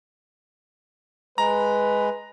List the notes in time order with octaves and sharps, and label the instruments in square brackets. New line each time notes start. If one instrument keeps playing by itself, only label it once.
[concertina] G#3 [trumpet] B4 [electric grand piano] A#5